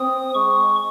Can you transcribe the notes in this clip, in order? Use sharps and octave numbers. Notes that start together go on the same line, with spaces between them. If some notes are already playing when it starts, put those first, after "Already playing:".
Already playing: C4 D#6
G#3 C#6